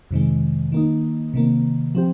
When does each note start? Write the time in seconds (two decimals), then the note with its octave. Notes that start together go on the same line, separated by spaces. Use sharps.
0.11 F2 C3 D#3 G#3
0.72 D#3 A#3 D#4
1.34 C3 D#3 A#3
1.95 F3 C4 G4